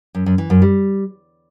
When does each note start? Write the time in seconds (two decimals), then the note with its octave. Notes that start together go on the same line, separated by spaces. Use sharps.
0.15 F#2
0.26 F#2
0.38 E3
0.50 F#2
0.62 G3